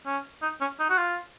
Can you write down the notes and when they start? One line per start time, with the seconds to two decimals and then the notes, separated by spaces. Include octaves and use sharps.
0.06 C#4
0.42 D#4
0.61 C#4
0.80 D#4
0.90 F#4
0.98 F4